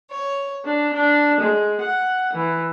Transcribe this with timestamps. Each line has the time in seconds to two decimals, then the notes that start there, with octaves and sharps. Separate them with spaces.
0.10 C#5
0.64 D4
0.93 D4
1.41 G#3
1.81 F#5
2.33 E3